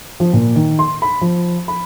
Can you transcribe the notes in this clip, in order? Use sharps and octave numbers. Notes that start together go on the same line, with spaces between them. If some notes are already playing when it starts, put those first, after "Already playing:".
F3
A#2
D#3
C6
B5
F3
B5